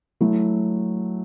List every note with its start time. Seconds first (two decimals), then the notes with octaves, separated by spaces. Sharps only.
0.21 F#3 A3 E4